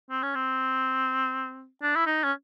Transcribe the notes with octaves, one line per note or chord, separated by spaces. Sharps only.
C4
C#4
C4
D4
E4
D#4
C#4